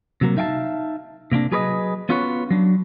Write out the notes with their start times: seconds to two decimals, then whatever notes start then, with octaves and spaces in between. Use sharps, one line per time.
0.21 C3 F#3 A#3
0.37 D#4 E5 F5 G5 A5
1.32 C3 A#3 C4 D4
1.52 F#3 G#4 B4 C#5 D#5
2.09 B3 C#4 F4 F#4 B4 C#5
2.51 F#3 D4